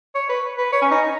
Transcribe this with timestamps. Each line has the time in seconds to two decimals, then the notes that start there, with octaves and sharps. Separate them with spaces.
0.15 C#5
0.29 B4
0.58 B4
0.72 C#5
0.82 C#4
0.91 D#4